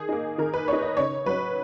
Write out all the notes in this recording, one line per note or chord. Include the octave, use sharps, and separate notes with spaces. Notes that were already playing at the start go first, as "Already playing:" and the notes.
Already playing: D#3 G#4
A#3 D#4
D#3 A#4
B4
A#3 D#4 C#5
D#5
C#3 C#5
F#3 C#4 B4